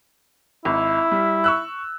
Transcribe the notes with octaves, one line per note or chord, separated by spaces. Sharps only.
G#1 E4
G3
C#6 E6 F#6